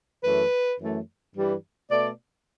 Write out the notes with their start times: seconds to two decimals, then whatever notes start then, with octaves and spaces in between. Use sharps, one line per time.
0.24 F#2 E3 A3 B4
0.80 F#2 E3 A3
1.35 G2 E3 G3
1.91 B2 A3 D5